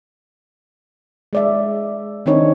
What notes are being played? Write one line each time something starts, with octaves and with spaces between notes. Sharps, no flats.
G#3 D5 E5
D#3 C4 D4 D#4 C#5